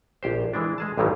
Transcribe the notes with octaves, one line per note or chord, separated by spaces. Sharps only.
A#1 G4 C5
E3 G#3 D4
G#3 G#4 A5
A1 G2 D3 D#3 F#3 G3